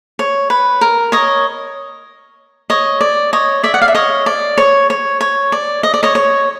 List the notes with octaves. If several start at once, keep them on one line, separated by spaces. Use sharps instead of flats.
C#5
B4
A#4
C#5 D#5
C#5 D#5
D5
C#5 D#5
D5 E5
F#5
F5
E5
C#5 D#5
D5
C#5
C#5
C#5
D5
D#5
D5
C#5 D#5
C#5